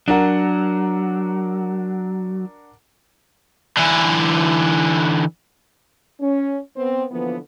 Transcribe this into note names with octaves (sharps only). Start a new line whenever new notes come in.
F#3 D4 A#4 F#5
D3 E3
C#4
B3 C4
D3 E3 F3 A#3 B3